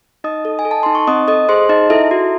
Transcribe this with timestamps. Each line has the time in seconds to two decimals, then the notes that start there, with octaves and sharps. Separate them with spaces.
0.24 D#4 D#5 D#6
0.45 A4
0.59 G#5
0.65 A4
0.71 A5
0.83 D#4 C6
0.95 C#6
1.07 C4 D#5 D#6
1.28 A4 D#5 D#6
1.49 G#4 C5 C6
1.69 D#4 D#5
1.90 E4 A4 E5
2.11 F#4